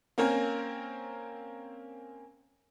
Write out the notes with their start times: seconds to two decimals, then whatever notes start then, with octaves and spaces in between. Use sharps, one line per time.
0.18 A#3 C4 C#4 A#4